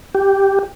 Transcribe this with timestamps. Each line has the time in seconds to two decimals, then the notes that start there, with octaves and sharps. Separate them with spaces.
0.15 G4